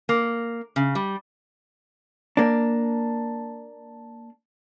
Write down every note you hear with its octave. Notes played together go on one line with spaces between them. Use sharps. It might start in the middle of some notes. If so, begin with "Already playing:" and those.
A#3
C#3
G3
A#3 D4